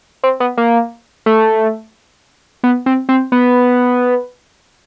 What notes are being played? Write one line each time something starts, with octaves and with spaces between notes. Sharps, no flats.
C4
B3
A#3
A3
B3
C4
C4
B3